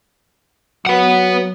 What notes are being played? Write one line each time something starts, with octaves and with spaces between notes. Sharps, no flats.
F#3 B4 F#5